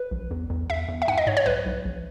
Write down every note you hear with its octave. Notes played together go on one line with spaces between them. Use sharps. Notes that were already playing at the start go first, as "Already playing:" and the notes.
Already playing: B4
A#1
E2
E2
E2 E5
E2
E5
G#2 F#5
D#5
G#2 C#5
C#5
B1 B4
B1
A#1